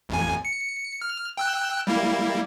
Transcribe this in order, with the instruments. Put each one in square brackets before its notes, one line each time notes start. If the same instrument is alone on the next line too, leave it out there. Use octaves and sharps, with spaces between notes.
[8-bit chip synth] A1 F2 G#5
C#7
F6
G5 E6 F#6
G3 A#3 E4